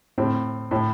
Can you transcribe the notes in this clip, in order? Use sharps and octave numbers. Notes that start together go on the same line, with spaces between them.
A2 C4
A2